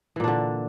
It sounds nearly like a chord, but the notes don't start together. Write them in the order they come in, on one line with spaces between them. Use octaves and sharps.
E3 A#2 D4 D3